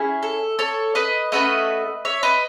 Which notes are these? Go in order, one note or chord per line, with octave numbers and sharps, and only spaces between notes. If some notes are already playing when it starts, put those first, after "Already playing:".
Already playing: C#4 E4 G#4
A4
A4 C#5
B4 D#5
A3 C#4 F#4 A4 B4 D#5
C#5 E5
B4 D#5